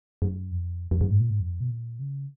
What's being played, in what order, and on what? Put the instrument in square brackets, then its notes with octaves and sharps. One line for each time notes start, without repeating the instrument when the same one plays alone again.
[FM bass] F#2
F2
F2
F#2
G#2
A#2
G#2
F2
B2
A#2
C#3